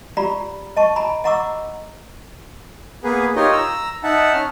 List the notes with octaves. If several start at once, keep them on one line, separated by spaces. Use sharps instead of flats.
F4 G4 D5 A#5 B5
D#5 A5 C#6
G#5 A#5 B5
D#5 F#5 A#5 C#6 D6 E6
A#3 B3 G#4 B4
D#4 F4 G4 A#4 C#5 D#5
A#5 E6
D#4 E5 F#5 A5
C#4 F6